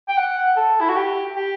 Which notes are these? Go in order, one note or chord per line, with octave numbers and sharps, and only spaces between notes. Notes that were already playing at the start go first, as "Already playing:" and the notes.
G5
F#5
A4
E4
F#4
G4
G4